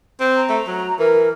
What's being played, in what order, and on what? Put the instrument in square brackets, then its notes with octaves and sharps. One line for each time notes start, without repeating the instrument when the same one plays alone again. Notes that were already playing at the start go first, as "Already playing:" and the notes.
[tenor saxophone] C4
[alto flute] A#5
[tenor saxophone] A3
F#3
[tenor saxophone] E3 [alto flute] A#4